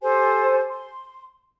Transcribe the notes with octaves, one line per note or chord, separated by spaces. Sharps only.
G4 A4 C5 G#5
C6